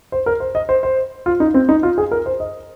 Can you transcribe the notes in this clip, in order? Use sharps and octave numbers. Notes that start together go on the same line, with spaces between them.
C5
A#4
C5
D#5
C5
C5
F4
D#4
C4
D#4
F4
G#4
A#4
C5
D#5